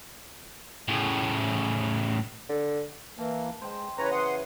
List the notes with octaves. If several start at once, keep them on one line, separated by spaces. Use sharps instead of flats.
A2 C#3
D3
E3 A#3 A5
G#3 C5 G5
C#3 E3 B4 C#5 A#5
F#5 C6 D#6